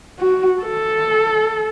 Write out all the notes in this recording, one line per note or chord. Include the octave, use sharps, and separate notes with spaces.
F#4
A4